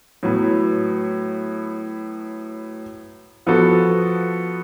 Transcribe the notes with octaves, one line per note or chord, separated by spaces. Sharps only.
A2 F#3 B3
F3 B3 F#4 A4